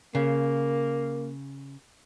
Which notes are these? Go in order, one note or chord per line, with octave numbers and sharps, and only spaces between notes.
C#3 A#3